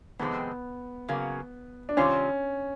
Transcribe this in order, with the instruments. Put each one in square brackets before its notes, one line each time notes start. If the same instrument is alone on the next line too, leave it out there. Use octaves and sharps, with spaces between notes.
[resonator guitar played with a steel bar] F2 C3 D#3 G#3 C4 [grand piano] B3
[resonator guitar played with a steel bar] C#3 F#3 A#3
[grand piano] D4
[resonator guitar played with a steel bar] C3 D#3 G3 C4 F4 [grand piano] C#4